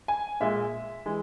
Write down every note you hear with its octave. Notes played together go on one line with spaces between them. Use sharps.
G#5
A#2 G#3 E5
E3 G#3